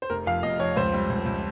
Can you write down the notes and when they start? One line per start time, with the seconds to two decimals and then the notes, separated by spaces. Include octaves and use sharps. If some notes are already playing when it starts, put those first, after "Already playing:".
0.02 C5
0.10 F1 A#4
0.26 F2 F5
0.43 F1 D#5
0.60 F2 C#5
0.76 C#2 C5
0.93 G3
1.10 C#2
1.26 C#2